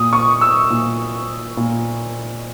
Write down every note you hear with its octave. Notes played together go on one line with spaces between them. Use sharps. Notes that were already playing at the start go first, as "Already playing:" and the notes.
Already playing: A#2 D#6
C#6
E6
A#2
A#2